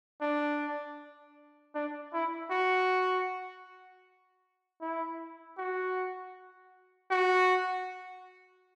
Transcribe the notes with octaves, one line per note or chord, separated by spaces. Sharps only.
D4
D4
E4
F#4
E4
F#4
F#4